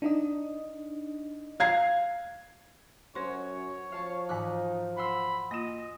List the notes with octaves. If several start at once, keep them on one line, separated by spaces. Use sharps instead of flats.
D4 D#4 D#5
F5 G#6 C7
F#2 F#4 C5 C#5 C6
C#5
F3 F5 A5 C#6
G#2 E3 D#4 D6 F#6
F#5 B5 C6 E6
A#3 F4 D#5